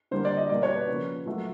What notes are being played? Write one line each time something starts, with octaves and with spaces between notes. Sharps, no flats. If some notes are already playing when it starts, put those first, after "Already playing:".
D3 G3 A#3 C5
D5
D#5
B2 G3 A#3 D5
C#5
B4
C#3 F3 A#3
A#2 F#3 A3